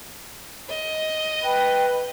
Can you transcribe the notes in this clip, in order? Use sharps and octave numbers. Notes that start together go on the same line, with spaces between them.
D#5
B4 G5